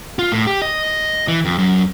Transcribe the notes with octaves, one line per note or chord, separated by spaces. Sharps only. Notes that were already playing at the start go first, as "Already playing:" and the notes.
F4
A2
G4
D#5
E3
F2
F#2